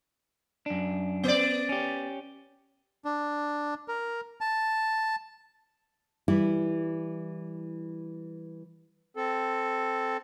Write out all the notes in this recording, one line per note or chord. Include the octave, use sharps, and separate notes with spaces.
F#2 D4
B3 D5
C#4 G4
D4
A#4
A5
E3 G3 E4
C4 A4